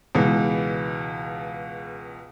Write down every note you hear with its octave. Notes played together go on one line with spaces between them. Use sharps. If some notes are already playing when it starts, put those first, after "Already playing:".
C#2 B2 E3 G#3